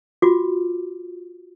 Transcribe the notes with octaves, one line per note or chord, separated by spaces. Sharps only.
F4 F#4 D6